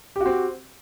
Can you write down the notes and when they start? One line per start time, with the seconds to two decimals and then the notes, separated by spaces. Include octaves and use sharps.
0.16 G4
0.21 F#4
0.26 C4